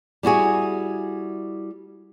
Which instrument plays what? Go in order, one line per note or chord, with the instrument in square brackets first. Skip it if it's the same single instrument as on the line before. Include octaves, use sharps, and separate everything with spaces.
[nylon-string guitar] G3 E4 F#4 G#4